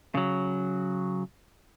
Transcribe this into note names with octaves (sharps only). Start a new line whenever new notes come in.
C#3 F#3